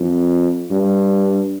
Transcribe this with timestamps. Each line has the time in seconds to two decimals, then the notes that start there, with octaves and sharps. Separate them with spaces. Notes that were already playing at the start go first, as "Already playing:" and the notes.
Already playing: F2
0.70 G2